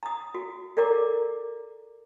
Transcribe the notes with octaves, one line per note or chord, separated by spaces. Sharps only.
A#5 D#6
F#4
A4 A#4 D5 A#5 D6